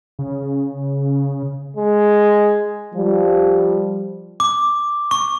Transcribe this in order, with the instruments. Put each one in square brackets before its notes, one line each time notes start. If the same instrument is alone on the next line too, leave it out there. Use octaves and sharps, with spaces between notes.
[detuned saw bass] C#3
[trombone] G#3
[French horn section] F3 G3
[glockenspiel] D6
C#6